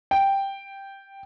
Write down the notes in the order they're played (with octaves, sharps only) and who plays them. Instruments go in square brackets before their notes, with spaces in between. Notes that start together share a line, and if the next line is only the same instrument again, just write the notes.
[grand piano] G5